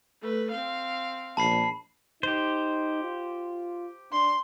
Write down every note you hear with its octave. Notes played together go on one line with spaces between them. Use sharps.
A3 B4
C4 F5
A#1 A5 B5 C7
D#4 G4 C5
F4
D4 C6